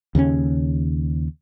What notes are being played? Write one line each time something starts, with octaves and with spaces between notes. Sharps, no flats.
D#2 C#3 G#3 C#4